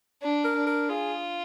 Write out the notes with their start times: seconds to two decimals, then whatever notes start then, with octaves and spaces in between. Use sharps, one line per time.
0.22 D4
0.44 A#4
0.56 D4
0.67 A#4
0.89 F4 G#4